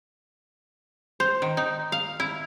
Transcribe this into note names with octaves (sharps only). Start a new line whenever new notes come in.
C5
D#3
D#4
F5
E4